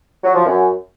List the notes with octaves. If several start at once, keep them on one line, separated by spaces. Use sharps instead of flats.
F#3
F3
F#2